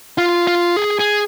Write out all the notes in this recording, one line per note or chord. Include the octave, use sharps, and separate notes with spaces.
F4
F4
G#4
G#4